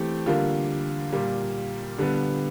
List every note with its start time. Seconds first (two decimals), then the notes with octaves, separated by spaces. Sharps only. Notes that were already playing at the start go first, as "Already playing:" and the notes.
Already playing: E3 A3 C4 G4
0.26 D3 G3 A#3 F4
1.12 A#2 G3 A#3
1.98 D3 G3 B3